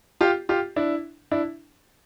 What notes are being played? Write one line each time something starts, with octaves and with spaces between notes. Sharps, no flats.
F4 G4
F4 G4
D4 E4
D4 E4